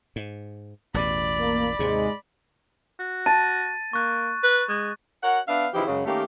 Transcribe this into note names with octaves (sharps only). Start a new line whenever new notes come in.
G#2
A1 E2 B2 D5 B5
A#3
D#2 G#2 C3 G#3
F#4
A5 A6 D#7
A#3 C#6 F#6
B4
G#3
F#4 A#4 C#5 F#5
B3 D4 D5 E5 F5
C#3 E3 F3 D#4 E4 G4
F#2 C#3 G#3
D#3 A3 A#3 C#4 G4